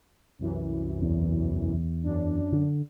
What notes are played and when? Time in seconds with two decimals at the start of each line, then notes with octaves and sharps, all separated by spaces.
0.39 C2 F#2 E3
1.02 E2
2.04 F#2 D4
2.52 D3